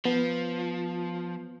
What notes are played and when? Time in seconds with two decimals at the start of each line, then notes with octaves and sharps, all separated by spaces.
0.05 F3 B3